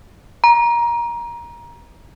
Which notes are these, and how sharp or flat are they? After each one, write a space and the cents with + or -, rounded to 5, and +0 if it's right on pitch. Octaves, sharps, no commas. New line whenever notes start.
A#5 +20